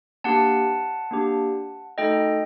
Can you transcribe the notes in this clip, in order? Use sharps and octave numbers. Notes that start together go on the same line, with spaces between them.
A#3 D4 G4 F#5 A5
A#3 D4 G4
A3 D#4 F#4 A4 D#5 G5